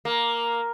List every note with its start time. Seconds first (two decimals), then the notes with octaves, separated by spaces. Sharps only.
0.05 A#3